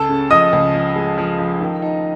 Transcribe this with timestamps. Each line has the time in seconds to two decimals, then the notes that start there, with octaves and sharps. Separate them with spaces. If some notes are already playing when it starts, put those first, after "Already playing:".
Already playing: C#2 A4 A5
0.09 C#3
0.30 F3 D#5 D#6
0.53 C#2
0.74 F3
0.96 G#3
1.18 F3
1.38 F3
1.60 D#3
1.82 D#4